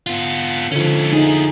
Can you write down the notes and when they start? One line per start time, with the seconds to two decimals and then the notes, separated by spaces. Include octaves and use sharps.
0.07 B3 F4
0.72 D3 F3 C#4 D#4
1.13 D#4 E4 G#4